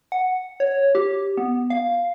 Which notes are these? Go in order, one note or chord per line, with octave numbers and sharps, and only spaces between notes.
F#5
C#5
G4
B3
F5